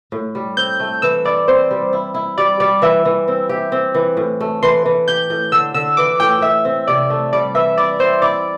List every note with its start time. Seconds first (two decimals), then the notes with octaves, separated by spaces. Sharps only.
0.12 A2
0.35 G3
0.57 C4 G6
0.80 A3
1.02 E3 E6
1.25 E4 D5
1.48 C4 C5
1.71 G3
1.93 E4
2.14 E4
2.38 G3 D5
2.60 G3 D5
2.82 E3 E5
3.05 E3
3.28 C4
3.49 G4
3.72 C4
3.95 E3
4.17 A2
4.41 A3
4.63 E3 C6
4.86 E3
5.08 G4 G6
5.30 A2
5.52 D3 E6
5.74 D3 E6
5.97 E3 D6
6.20 A2 G5
6.42 A2 E5
6.65 C4
6.87 C3 D5
7.10 A3
7.33 G3 D5
7.55 E3 E5
7.78 E4 D5
7.99 C4 C5
8.22 E4 D5